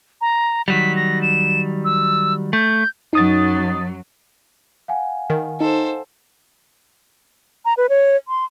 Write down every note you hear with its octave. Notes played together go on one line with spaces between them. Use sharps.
A#5
D#3 F#3 G3 B6
A#6
E7
E6
A3 G6
F#2 F#3 D#4 D#6 A6
F5 F#5 G#5
D#3
D#4 A4 C5
A#5
B4
C#5
C6